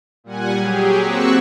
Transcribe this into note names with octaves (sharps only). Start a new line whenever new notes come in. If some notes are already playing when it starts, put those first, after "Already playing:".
A#2 G3 F#5 G#5
F#3 G4 G#4
A#3 C4 F#4 C#6 E6 F#6